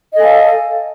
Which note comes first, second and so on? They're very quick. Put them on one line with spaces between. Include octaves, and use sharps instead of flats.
D#5 A4 G#5 F5